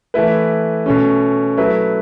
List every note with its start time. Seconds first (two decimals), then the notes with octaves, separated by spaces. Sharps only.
0.14 E3 A3 E4 B4
0.86 B2 A3 C#4
1.57 F#3 A3 E4 B4